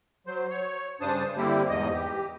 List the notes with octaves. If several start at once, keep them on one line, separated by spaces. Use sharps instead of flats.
F#3 C5
C#5
G2 C#3 D4 C5 A5 D#6
D3 G3 A#3 C4 E4 G4
E2 G#2 D#5
G4